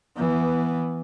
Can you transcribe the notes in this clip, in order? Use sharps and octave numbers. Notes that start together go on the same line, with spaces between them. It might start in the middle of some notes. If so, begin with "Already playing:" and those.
E3 B3